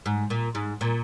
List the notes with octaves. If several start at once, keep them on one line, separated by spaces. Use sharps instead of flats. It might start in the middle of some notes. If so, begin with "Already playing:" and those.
G#2
A#2
G#2
A#2